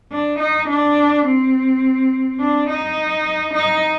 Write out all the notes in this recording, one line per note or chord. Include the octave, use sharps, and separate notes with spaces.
D4
D#4
D4
C4
D4
D#4
D#4